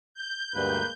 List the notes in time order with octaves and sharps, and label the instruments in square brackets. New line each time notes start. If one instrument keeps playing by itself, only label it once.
[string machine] G6
[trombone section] D2 G2 [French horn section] G#3 A#3 [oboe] B4